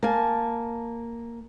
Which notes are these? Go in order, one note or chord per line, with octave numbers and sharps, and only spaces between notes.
A#3 F5 G#5 A5